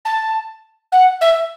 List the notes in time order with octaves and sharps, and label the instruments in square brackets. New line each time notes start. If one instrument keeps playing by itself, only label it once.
[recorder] A5
F#5
E5